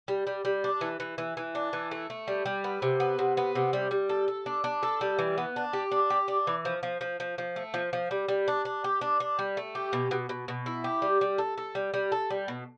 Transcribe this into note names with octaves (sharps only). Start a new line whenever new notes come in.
G3
G3
G3
D4
E3
E3
E3
E3
D4
E3
A3
A3
G3
G3
B3
C3
B3
C3
B3
C3
G3
G3
A4
A4
D4
D4
A4
G3
E3
B3
D4
G4
D4
G4
D4
E3
F3
F3
F3
F3
F3
A3
F3
F3
G3
G3
D4
D4
G4
D4
D4
G3
A3
G4
B2
B2
B2
B2
E4
G4
G3
G3
A4
A4
G3
G3
A4
G3
B2